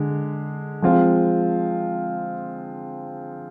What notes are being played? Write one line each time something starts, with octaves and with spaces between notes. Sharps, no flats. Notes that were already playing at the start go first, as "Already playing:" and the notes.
Already playing: D3 G#3
F3 G#3 C4 F4